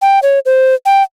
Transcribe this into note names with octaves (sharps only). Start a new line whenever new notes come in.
G5
C#5
C5
G5